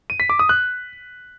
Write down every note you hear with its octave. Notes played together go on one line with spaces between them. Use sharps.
D#7
B6
D6
D#6
F#6